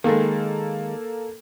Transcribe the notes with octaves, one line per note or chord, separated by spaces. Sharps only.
D#3 G#3 A#3 A4